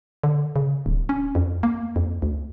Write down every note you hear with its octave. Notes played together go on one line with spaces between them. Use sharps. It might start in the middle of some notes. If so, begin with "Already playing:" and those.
D3
C#3
D1
C#4
F2
A#3
F2
D2